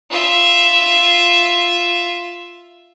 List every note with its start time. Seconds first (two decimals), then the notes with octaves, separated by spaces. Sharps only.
0.10 F4 E5